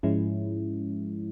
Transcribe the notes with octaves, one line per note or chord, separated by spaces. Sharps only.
G#2 F3 G#3 C#4 E4